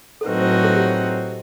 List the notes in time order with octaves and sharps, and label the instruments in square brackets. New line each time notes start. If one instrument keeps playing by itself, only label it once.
[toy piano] A4
[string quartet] A2 F#3 C4 D#4 F#4 [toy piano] B4
[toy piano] C5
B4
A4
G4